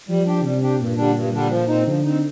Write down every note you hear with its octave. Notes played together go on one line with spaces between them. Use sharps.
F3 G3
D4 G4
C3 G3
D4 G4
G2 A#2
D3 G3 D4
G2
D3 G3 D4
F3
C4 D#4
D3 F3
C4 D#4